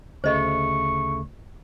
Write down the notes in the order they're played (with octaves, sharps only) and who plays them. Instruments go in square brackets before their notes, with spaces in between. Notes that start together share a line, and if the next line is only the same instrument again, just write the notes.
[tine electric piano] D2 C#3 A3 [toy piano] C5 D#5 [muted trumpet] C#6